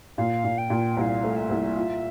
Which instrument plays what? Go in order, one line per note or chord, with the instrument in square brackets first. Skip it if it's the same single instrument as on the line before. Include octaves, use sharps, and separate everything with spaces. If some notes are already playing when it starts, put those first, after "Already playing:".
[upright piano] A#2 [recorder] F5
[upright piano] A#2
[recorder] G5
[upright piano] A#2
[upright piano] C2 [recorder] G5
[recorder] F5
[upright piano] A3
[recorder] E5
[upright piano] C2
F4